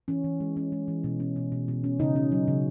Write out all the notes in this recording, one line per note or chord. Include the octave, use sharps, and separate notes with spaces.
E3 C#4
E3
G#3
C#4
G#3
E3
B2
C#4
B2
B2
B2
C#4
C#3 D#4
C#4
F#3
C#3